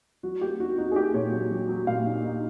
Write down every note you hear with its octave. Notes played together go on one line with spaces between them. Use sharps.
F#3 F#4
A#3 G4
D#4 F#4
D#4 F#4
G#4
A#3 G4
A#2 C#5
F#3
F#3
F#3
A#2 F5
D#4
D#4